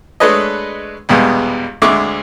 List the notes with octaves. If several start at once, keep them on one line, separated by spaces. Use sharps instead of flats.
G#3 A3 D4 B4 C#5 D#5
A#1 E2 B2 G3 G#3 B3
D2 D3 G#3 E5 C#6 D6